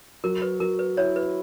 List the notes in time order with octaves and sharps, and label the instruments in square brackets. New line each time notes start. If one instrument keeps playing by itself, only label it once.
[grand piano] F#3 [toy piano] A#4
[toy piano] B4
[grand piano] F#3 [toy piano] A#4
[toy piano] B4
[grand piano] E4 [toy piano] C#5
[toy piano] B4